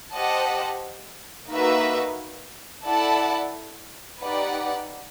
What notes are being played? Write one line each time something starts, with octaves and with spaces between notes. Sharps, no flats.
G4 C5 D#5 F#5 A5
A#3 D#4 F#4 B4 E5
E4 A4 D5 F#5 A5
D#4 G4 B4 D5 F#5